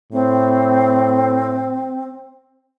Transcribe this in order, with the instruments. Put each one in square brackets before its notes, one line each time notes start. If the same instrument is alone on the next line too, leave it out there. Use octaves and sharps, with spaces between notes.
[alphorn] A2 [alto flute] C4